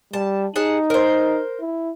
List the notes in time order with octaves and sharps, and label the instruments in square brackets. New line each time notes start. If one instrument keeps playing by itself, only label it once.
[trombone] G3 [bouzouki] A5
[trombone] D#4 [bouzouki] G#4 F#5 A5
[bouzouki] A#4 C5
[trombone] E4